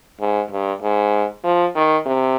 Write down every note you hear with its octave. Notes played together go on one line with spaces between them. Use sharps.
G#2
G2
G#2
F3
D#3
C3